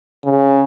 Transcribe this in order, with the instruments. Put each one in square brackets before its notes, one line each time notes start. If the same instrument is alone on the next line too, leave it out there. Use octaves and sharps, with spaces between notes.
[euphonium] C#3